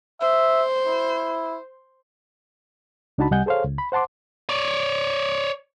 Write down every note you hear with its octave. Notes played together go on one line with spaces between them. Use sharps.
C5 E5
E4
C#2 D4 D#4 F#4 A5 B5
C2 G3 D#5 F#5 G#5 G6
G#4 A4 C5 C#5 F5
C#2
B5
C5 F#5 A5 C6 D6
C#5 D5